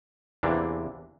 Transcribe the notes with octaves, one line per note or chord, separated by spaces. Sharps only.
E2 C3 E3 A#3 D4